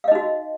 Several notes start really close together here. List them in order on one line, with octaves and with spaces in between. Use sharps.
F5 D#5 D#4 F#4